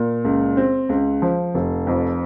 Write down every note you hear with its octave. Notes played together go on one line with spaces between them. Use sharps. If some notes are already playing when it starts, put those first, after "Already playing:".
Already playing: A#2
C#2
C4
C#2
F3
F1
F2